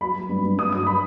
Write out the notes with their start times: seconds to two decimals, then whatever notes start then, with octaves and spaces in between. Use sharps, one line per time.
0.01 F#3 B5
0.16 F#3
0.29 G2
0.43 G2
0.58 G2 D#6
0.72 F#3 D#6
0.87 F#3 B5